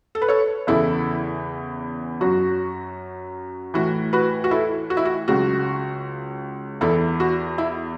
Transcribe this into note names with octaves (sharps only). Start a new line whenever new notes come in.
A4
B4
A4 C#5
E2 C#3 E3 E4 A4
F#2 F#3 F#4
A2 E3 F#4
F#4 B4
F#4
E4 A4
F#4
E4
F#4
C#2 C#3 F#3 F#4
E2 E3 E4 A4
F#4
E4